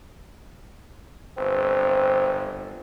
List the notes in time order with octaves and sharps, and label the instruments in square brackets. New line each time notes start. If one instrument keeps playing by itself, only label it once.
[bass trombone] G1 [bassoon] C4